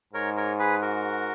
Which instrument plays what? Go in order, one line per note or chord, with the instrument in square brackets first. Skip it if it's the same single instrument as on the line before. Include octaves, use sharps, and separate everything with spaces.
[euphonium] G#2 [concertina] A#4 C#5
[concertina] A#4 C#5
G#4 B4
F#4 A#4